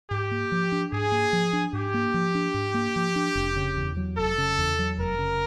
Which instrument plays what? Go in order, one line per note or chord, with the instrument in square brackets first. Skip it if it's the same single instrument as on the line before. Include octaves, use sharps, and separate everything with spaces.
[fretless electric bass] G#2 [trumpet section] G4
[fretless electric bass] A#3
F3
D4
[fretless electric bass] G#2 [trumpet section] G#4
[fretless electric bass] A#3
F3
D4
[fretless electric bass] G#2 [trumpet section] G4
[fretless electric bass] A#3
F3
D4
G#2
A#3
F3
D4
F1
C#3
E2
F#3
[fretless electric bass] F1 [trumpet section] A4
[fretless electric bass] C#3
E2
F#3
[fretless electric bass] F1 [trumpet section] A#4
[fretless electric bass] C#3